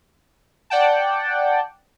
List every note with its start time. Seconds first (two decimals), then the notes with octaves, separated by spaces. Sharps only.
0.70 D5 F#5 G5 A5